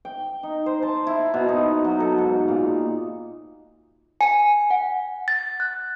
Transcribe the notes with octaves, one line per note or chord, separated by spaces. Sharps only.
G5
D#4
C5
A5
E4
B2
D#4
F#3
A4
G#2
A#2
G#5
F#5
A6
F#6